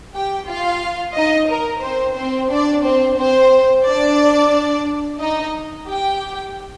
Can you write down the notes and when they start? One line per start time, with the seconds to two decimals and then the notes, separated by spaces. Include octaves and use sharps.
0.15 G4 G5
0.47 F4 F5
1.15 D#4 D#5
1.48 A#4
1.82 C4 C5
2.16 C4 C5
2.51 D4 D5
2.84 C4 C5
3.17 C4 C5
3.85 D4 D5
5.20 D#4 D#5
5.87 G4 G5